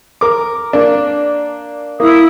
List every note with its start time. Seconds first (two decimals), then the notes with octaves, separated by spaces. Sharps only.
0.21 A#4 D6
0.73 A#3 D4
2.00 A#3 E4 D#6